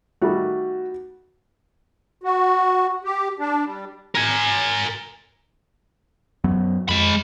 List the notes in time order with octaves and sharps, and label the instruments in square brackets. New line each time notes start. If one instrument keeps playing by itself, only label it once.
[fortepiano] D#3 G3 A3 [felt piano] F#4
[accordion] F#4
G4
D4
G3
[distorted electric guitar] A#4 G#5
[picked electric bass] F#2 F#3 B3
[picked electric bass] F2 [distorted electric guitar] G#3 B5